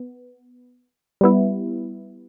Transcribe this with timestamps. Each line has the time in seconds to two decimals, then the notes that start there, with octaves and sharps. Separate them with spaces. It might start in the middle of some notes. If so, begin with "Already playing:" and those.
Already playing: B3
1.21 G3 B3 E4